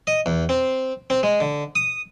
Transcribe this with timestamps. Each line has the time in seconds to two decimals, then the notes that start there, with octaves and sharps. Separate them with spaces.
0.07 D#5
0.26 E2
0.49 C4
1.10 C4
1.23 G#3
1.40 D3
1.75 D#6